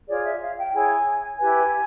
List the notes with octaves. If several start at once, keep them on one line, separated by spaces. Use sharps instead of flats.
F4 G#4 C#5 D5
E5
F5
G5
E4 G#4 C#5 G#5
E4 G4 B4 G#5